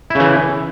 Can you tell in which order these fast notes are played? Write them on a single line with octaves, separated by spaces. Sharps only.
E4 C#3 E3